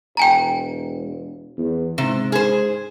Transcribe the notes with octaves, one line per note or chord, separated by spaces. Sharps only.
E1 G5 G#5 A#5
E2
G#2 C3
G#4 C5